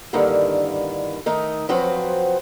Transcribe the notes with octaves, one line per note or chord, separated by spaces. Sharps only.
G2 D3 D#3 A#3 E4
D#3 A3 D#4
F3 F#3 C4 F#4 B4 C5